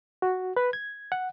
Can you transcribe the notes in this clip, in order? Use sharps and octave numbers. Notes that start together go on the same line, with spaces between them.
F#4
B4
G#6
F#5